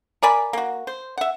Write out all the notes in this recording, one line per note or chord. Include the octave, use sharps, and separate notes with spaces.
A#4 D5 G#5 B5
A#3 F#4
C5
E5 F#5